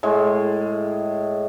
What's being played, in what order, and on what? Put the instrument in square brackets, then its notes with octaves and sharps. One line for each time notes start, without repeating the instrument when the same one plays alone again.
[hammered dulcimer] A2 G#3